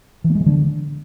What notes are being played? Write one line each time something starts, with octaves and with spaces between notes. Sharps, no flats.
E3
A#3
G#3
E3
D3